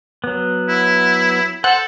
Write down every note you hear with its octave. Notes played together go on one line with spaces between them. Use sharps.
F#3 B3
E4
A4 C5 F#5